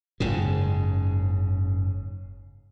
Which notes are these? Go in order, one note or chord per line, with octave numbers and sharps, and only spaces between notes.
F#1 G#2 C#3